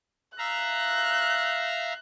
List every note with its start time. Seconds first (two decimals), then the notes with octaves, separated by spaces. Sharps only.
0.38 E5 F5 A#5 F#6